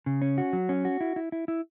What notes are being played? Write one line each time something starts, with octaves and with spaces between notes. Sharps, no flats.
C#3
C#4
F#4
F#3
C#4
F#4
E4
E4
E4
E4